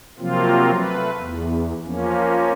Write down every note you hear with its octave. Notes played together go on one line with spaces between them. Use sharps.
C3 F3 F#3 A#3 C4 F4
A3 B4
E2
F3 A#3 C#4